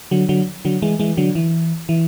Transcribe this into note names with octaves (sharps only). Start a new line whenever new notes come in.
D3 F#3
D3 F#3
D3 F#3
E3 G#3
E3 G#3
D3 F#3
E3
E3